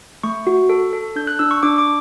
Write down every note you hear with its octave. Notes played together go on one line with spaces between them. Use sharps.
A3 C#6
F#4
A4
A4
D4 G6
F#6
D4 E6
C#6
D4 D6
D6